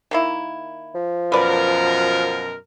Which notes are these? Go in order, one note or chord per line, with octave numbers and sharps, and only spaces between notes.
D#3 A#3 E4
F3
F#2 B2 A#4 B4 D5